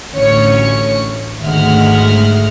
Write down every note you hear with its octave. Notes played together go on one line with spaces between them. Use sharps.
A1 D2 C#4 C#5 C#7
G#1 D2 G#3 E5 F#5 F6